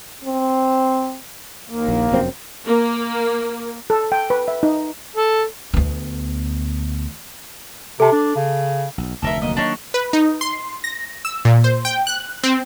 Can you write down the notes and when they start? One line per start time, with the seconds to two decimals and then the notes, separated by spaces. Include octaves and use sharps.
0.24 C4
1.70 D#2 A#3
1.88 A#1
2.12 F1 F#2 C4
2.66 A#3
3.90 A4
4.12 G5
4.30 B4
4.48 E5
4.63 D#4
5.16 A4
5.74 D2 B3
8.00 C3 A4 A5
8.12 D4
8.36 C#3
8.98 B1
9.22 F1 D2 A4 A#4 E5
9.42 D#3 F#3 A#3 D#5
9.57 D4 D#4 C#5
9.94 B4
10.13 D#4
10.41 C6
10.84 A#6
11.25 E6
11.45 A#2
11.64 C5
11.85 G5
12.07 F#6
12.43 C4